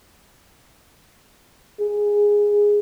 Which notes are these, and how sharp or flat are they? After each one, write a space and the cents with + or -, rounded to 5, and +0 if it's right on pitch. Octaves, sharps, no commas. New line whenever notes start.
G#4 -10